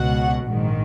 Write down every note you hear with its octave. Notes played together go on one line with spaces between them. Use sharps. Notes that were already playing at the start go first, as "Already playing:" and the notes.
Already playing: C#2 B2 F#4 F#5
A#1 G#2 D#3